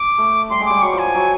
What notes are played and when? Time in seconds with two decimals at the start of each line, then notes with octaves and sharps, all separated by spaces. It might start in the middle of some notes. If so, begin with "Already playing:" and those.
Already playing: D6
0.18 A3
0.50 G3 C6
0.60 G#3
0.66 G3 D6
0.82 F#3 C#6
0.93 F3
0.98 G#5
1.04 F3
1.15 F#3